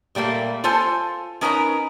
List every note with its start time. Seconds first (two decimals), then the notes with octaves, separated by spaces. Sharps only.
0.15 A#2 G3 A3 A#3
0.64 F4 A4 C5 G#5 A5
1.41 C#4 D#4 A#4 B4 G5 A#5